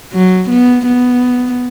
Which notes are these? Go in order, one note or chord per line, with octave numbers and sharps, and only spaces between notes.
F#3
B3
B3